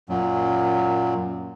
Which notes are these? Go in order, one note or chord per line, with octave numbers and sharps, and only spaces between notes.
F#2 A#2 F#3